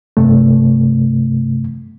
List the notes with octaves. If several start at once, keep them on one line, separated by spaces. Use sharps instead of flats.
G2 C3 A3